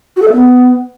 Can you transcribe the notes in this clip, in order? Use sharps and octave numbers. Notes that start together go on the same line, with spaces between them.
F#4
A4
E5
B3